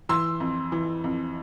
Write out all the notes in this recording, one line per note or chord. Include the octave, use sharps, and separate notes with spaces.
E3 C6 E6
F2
E3
F2